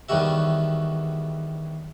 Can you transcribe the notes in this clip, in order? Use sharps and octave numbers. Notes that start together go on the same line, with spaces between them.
E2 D#3 F#3 G3 F#4 E5